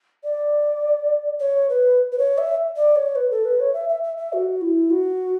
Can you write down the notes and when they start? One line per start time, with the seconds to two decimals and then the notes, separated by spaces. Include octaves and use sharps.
0.24 D5
1.40 C#5
1.69 B4
2.12 B4
2.18 C#5
2.38 E5
2.76 D5
2.96 C#5
3.16 B4
3.31 A4
3.45 B4
3.60 C#5
3.74 E5
3.89 E5
4.03 E5
4.17 E5
4.33 F#4
4.61 E4
4.90 F#4